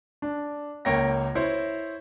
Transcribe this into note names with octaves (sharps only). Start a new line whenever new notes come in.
D4
C#2 A#3 C#5 G5 A#6
E4 C5 C#5